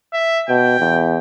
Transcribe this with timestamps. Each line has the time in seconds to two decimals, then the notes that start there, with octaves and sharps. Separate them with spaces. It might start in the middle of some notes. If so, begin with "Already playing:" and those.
0.13 E5
0.49 B2 G5
0.79 E2